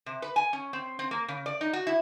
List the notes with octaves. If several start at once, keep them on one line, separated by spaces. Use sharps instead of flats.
C3
B4
G#5
C#4
C4
C4
A#3
C#3
D5
D#4
F#4
E4